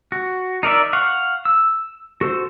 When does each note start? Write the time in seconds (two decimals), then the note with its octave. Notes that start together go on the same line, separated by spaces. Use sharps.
0.12 F#4
0.63 D#4 A#4 D5 E5
0.93 F5 F#5 C#6
1.45 E6
2.21 F#4 A4 C5